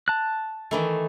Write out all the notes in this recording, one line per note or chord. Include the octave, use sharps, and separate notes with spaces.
A5 F#6
D#3 E3 A3